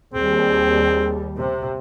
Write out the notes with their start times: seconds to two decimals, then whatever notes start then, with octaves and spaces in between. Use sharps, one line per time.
0.14 D#2 G3 C4 G#4
1.36 C3